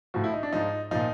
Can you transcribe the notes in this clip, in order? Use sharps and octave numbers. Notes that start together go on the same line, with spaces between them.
A2 F3 F#4
E4
D#4
D4
G#2 F3 D#4
A#2 F3 D#4